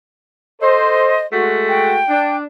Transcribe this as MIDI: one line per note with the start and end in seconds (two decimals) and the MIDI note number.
0.61 1.21 69
0.61 1.21 72
0.61 1.26 75
1.32 1.99 56
1.32 1.99 57
1.32 1.99 66
1.68 2.37 79
2.09 2.44 62